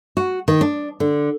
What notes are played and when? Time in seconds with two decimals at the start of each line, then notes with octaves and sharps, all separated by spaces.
0.17 F#4
0.48 D#3
0.61 D4
1.00 D3